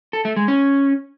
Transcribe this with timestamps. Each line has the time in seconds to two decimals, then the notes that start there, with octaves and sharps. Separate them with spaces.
0.13 A4
0.25 A3
0.36 G#3
0.48 C#4